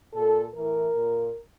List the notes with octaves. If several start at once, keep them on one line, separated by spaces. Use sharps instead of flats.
A#2 A4
A2 E3 A#4
A#2